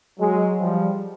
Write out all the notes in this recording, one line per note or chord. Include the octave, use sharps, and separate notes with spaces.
F#3 G#3
F3 G3